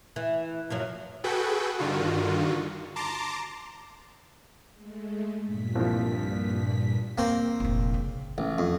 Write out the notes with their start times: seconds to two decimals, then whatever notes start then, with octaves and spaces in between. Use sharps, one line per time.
0.16 E3
0.70 F#2 F3 F#3
1.24 F#4 G#4 A4 B4 G5
1.78 G2 D3 D#3 F4 F#4
2.96 A5 A#5 C6 D6
4.73 G#3 A3
5.43 G2 A#2 B6
5.76 C2 F3
7.18 E2 A#3 C4 C5
7.60 F1 A#1
7.94 C#3
8.38 A1
8.58 F2